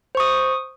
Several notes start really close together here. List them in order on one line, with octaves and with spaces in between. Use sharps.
C5 C#6 D#6